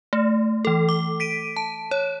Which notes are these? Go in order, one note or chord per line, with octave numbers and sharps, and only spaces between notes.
A3
E3 A4
D6
B6 D7 D#7
A5
C#5